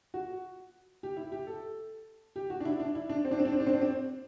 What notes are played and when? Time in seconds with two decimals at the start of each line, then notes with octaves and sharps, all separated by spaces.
0.14 F#4
1.03 G4
1.17 E4
1.32 G4
1.47 A4
2.36 G4
2.50 F#4
2.60 D4
2.65 E4
2.80 D4
2.95 E4
3.09 D4
3.25 C4
3.31 D4
3.39 C4
3.45 D4
3.53 C4
3.60 D4
3.67 C4
3.74 D4
3.82 C4